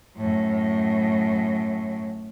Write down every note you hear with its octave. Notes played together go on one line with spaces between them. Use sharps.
F#2 A2